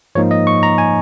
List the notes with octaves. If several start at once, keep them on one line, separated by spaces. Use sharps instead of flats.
G#2 F3 A#3 D#4 C#5
D#5
C#6
A#5
G#5